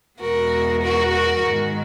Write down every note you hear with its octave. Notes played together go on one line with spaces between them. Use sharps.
E2 B2 G#3 B3 F#4 A#4
F#4 A#4
F#4 A#4
G#2 D#3 G#3